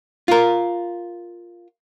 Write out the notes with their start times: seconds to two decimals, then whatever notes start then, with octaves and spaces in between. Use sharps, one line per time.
0.28 F4 A#4